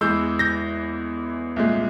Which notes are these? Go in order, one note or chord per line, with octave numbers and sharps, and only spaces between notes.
E2 E3 G#3 E6 G6
G6 A#6
C2 A#2 G#3